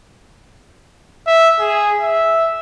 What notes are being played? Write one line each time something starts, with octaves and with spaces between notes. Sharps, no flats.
E5
G#4
E5